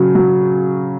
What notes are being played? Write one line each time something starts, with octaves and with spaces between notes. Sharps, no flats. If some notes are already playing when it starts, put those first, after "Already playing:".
Already playing: C#3 F#3
F#3